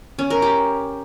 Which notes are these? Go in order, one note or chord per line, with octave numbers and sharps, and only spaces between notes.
C#4
A#4
G4